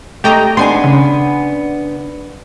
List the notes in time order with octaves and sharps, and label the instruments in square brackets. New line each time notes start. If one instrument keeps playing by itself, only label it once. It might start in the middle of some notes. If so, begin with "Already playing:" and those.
[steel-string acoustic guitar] A3 D#5 [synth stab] G4 G5 A#5
[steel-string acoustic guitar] B3 D4 G#5 [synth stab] C6
[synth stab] C#3